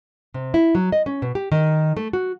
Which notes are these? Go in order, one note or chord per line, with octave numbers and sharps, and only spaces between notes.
C3
E4
F#3
D#5
C#4
B2
G4
D#3
A3
F#4